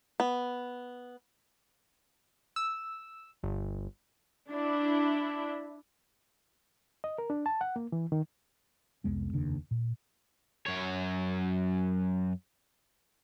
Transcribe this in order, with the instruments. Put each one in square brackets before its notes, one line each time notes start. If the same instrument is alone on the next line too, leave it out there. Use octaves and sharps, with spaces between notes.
[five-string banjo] B3
[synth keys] E6
G1
[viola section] D4 E4
[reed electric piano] D#5
A#4
D4
A5
F#5
A#3
E3
D#3
[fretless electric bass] C2 F2 G#3 B3
F1 D#2 C#3 D4
A#2
[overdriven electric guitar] F#2 C#5